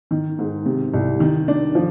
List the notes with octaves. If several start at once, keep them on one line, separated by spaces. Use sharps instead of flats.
D#3
G#2
C3
C2
D#3
D4
F3